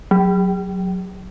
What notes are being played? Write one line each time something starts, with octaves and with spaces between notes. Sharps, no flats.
F#3